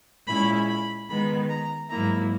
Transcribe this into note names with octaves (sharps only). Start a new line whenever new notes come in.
A#2 G#3 C#4 E4 B5
B5
D#3 G#3 B3 B5
A#5
G#2 F#3 A#3 E4 A#5